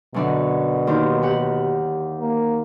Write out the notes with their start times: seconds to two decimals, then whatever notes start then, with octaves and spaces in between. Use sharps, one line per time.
0.14 F#2 B2 D3 D5
0.87 D#2 D#3 C5
1.22 G4 F#5
2.20 A#3